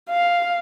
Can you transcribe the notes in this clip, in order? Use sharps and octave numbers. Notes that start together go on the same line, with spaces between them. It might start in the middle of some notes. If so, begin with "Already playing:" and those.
F5